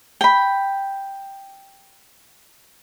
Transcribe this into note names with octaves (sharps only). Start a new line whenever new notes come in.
G5 B5